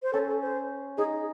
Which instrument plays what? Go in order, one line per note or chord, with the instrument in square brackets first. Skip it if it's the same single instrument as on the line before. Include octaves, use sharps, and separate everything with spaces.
[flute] C5
[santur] C#4 [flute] A4
[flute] A4
C5
[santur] D#4 [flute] G#4